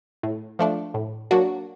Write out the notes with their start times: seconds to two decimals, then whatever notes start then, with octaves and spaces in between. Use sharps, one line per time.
0.23 A2
0.59 F3 A3 D4
0.94 A2
1.31 F#3 A#3 D4 F#4